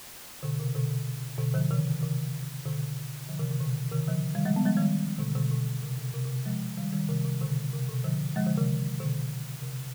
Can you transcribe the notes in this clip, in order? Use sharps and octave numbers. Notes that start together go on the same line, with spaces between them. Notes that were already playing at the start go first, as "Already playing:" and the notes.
B2 D3
C3
B2 D3
B2 D3
D3 F3
C3 D#3
C3 D#3
B2 D3
D3 F3
C3 D#3
C3
B2 D3
C3 D#3
D3 F3
D#3 G3
F3 G#3
G3 B3
F3 G#3
D#3 G3
B2 D3
B2 D3
B2
C3
B2
C3
C3
C3
F3 G#3
D#3 G3
D#3 G3
C3 D#3
C3
B2 D3
C3
B2
D3 F3
F3 G#3
D3 F3
C3 D#3
B2 D3
C3